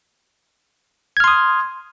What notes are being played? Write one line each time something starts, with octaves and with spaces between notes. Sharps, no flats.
C6 D#6 F6 G#6